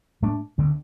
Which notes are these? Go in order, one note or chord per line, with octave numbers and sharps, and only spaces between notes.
A2 A3 D4
D2 D3 C4